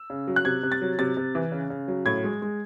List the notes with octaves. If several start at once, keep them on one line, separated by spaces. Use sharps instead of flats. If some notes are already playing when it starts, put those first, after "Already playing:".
Already playing: E6
C#3
F#3
F#6
C3 G#6
C3
A6
F#3
C3 A6
C3
E3
C#3
C#3
F#3
A2 G#6
G#3
G#3